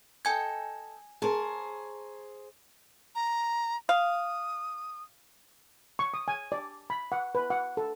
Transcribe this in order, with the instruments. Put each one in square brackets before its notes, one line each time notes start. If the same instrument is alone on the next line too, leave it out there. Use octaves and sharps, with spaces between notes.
[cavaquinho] A4 D#5 G5 [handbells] G#5 G#6
[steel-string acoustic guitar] G#4 C5 [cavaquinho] A#4 C#5 A5
[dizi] A#5
[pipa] F5 [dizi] D#6
[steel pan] C#6
D#6
G#5
D5
B5
F#5
B4
F#5
A4